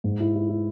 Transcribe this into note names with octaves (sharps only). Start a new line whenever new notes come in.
G#2
E4
E4
E4